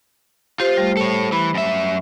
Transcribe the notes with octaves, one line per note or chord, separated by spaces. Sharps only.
F4 G4 C5
G3 A3
A4 C#5
E3 B5
F#2 E5